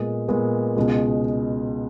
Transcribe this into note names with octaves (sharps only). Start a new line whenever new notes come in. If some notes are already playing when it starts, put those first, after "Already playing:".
Already playing: A#2 G#3 B3
A#2 G#3 B3
C#2 B2 G#3